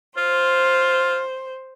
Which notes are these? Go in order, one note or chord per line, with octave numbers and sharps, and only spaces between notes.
F4 C5